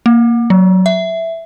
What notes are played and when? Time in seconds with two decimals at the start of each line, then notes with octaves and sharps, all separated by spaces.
0.06 A#3
0.50 F#3
0.86 E5